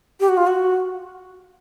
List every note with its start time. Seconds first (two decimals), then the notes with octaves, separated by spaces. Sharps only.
0.20 G4
0.29 F#4
0.37 F4
0.47 F#4